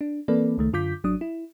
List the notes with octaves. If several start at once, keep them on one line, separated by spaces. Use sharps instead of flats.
D4
E3 A#3 C4 A4 B4 D5
C#2 D#3 A3
F#2 D3 F4 D6 G6 B6
G#1 F#3 D4 D#6
E4